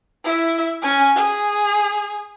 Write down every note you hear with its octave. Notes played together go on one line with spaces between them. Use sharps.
E4 E5
C#4 G#5
G#4